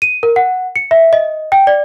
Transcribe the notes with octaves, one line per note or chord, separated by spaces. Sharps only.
D#7
A#4
F#5
C#7
E5
D#5
G5
D5